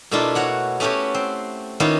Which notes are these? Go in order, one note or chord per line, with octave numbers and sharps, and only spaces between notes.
B2 A3 A#3 D4 E4 F4
F#4 C#5 F#5
A3 B3 C#4 F#4 G4 C#5
C4
D#3 A#3 B3 C#4 E4 F4